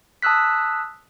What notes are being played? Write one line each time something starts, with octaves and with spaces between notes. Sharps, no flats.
A5 D#6 E6 F#6 B6